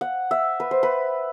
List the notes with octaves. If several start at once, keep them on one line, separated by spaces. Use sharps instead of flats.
F#5
E5
B4
C5
B4